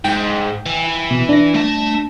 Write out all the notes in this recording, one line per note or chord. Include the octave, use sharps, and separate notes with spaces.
G#2 G5
E3
B2
D4 A#6
A3 A5